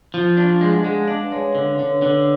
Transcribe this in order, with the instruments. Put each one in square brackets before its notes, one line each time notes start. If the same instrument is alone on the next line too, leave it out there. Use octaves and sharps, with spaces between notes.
[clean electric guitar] F3
[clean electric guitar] D4 [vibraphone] F5
[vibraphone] F5
[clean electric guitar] G#3 [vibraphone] F5
[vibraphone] F#5
[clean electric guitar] G#3 [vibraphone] F5
[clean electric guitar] D4 [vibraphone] F5
[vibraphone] B4
[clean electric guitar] G#3 [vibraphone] C#5
[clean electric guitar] D3
[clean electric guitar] D3 [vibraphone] C#5
[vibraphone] B4
[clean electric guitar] D3 [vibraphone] C#5